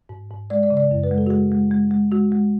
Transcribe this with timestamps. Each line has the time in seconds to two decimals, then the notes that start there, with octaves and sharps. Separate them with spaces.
0.09 G#2
0.31 G#2
0.50 G#3 D5
0.63 D5
0.70 C#3
0.77 D5
0.91 F#2
1.03 B4
1.11 G#3
1.18 A4
1.26 F#4
1.30 G#3 G#4
1.52 G#3
1.71 G#3
1.91 G#3
2.12 G#3 F#4
2.32 G#3